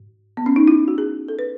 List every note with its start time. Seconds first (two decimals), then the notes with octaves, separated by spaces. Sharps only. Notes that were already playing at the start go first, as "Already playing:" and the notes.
Already playing: G#2
0.37 B3
0.46 C#4
0.56 D#4
0.68 E4
0.88 F#4
0.98 G#4
1.29 A4
1.39 B4